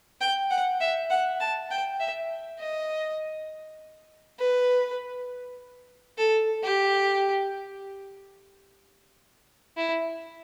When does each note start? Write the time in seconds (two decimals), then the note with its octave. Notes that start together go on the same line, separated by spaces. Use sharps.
0.21 G5
0.51 F#5
0.80 E5
1.10 F#5
1.40 A5
1.71 G5
2.00 E5
2.59 D#5
4.40 B4
6.18 A4
6.64 G4
9.77 E4